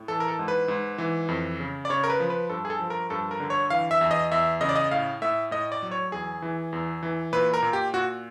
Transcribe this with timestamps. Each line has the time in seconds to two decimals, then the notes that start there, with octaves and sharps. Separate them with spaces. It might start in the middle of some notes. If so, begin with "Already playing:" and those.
Already playing: A2
0.08 E3 A4
0.20 A#4
0.28 A4
0.39 G#2
0.48 B4
0.68 G#2
0.98 E3
1.29 F2
1.60 C#3
1.85 D5
1.90 C#3 C#5
2.04 A#4
2.10 B4
2.20 F3
2.30 B4
2.50 G2 A4
2.65 G#4
2.70 A4
2.80 F3
2.90 A#4
3.10 G2 A4
3.31 A#4
3.40 D3
3.50 C#5
3.70 E3 F5
3.91 E5
4.01 E2
4.11 D#5
4.31 E2 E5
4.61 C#3 D#5
4.69 D5
4.76 D#5
4.91 A2 F5
5.22 A2 E5
5.51 A2 D#5
5.72 D5
5.82 F#3
5.92 C#5
6.12 E2 G#4
6.42 E3
6.73 E2
7.03 E3
7.33 A#2 B4
7.54 A#4
7.62 A#2
7.73 G4
7.93 A#2 F#4